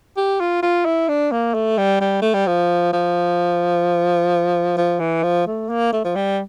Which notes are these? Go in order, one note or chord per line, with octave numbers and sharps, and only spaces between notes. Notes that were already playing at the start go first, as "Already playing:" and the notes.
G4
F4
F4
E4
D4
A#3
A3
G3
G3
A3
G3
F3
F3
F3
E3
F3
A3
A#3
A3
F3
G3